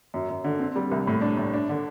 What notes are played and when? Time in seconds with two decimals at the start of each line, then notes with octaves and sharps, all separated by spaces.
0.14 F#2
0.29 F#2
0.44 D3
0.59 C4
0.76 G3
0.91 C2
1.07 A2
1.21 D4
1.37 A2
1.54 D4
1.69 D3